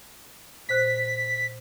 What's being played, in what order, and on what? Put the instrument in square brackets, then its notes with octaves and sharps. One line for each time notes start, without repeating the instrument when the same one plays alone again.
[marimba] A#2 C5 F#6 [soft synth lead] B6